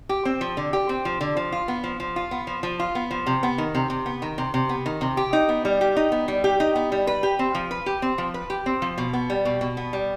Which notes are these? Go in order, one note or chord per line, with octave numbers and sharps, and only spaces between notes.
G4
C4
F3
D3
G4
C4
F3
D3
F3
F4
B3
F3
F3
F4
B3
F3
F3
F4
B3
F3
C3
B3
D#3
C3
C3
B3
D#3
C3
C3
B3
D#3
C3
G4
D#4
B3
G3
G4
D#4
B3
G3
G4
D#4
B3
G3
B4
G4
C4
F3
B4
G4
C4
F3
B4
G4
C4
F3
B2
B3
G3
B2
B2
B3
G3